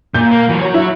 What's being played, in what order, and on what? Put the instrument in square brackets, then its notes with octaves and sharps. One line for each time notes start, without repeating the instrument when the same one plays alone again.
[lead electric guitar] A#2 [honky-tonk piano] G6
[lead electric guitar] A#3
E3 F#3
F#4 C#5
[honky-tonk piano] E4